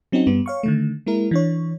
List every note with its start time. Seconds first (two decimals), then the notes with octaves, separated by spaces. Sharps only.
0.12 F#3 C4 C#4 D#4 F#4
0.27 G2 G3 B3
0.46 C#5 F5 C#6
0.63 D3 D#3 A3
1.06 G#3 A#3 E4 A#4
1.31 E3 D4 C#5